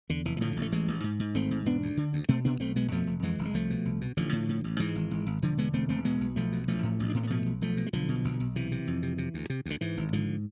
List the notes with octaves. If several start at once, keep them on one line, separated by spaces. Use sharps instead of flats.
E2 D3
F1 E3
E3
A2 D3 F3
A1
A3
A1 E3 G#3
A1
G#2
G#2
G#1 A3 C4
G#2
E1 B3 D4
D2
D3
D2
B2 A3 C4
B2 B3 D4
B1 A3 C4
B2 G#3 B3
F2 F3 A3
F1
F2 E3 G#3
F1
G#3
C2 F3 A3
B2
C2
B2
A1 D3 F3
A2
A2
A1
G#2 E3 G#3
G#1
G#1
G#1
E1 D3 F3
D3 G#3 B3
E1 A3 C4
E1 A3 C4
B2 G#3 B3
B1
B1 F3 A3
B2
A1 F3 A3
A2
A1
D4
A2 C4
B3
B2 F3 A3
B1
B1 F3 A3
B2
G#3
B1 D3 F3
B2
B1
B1
C3 E3
C3
F2
C3
C3
D2
C3
D2 D3
G#2 E3
G#1
G#2 D3 F3